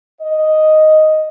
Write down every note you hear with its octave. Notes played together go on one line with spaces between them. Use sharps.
D#5